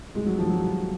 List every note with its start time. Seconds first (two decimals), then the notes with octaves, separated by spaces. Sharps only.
0.15 C2 G#3
0.26 F#3
0.38 C3 D#3 F3
0.49 F#3
0.61 C2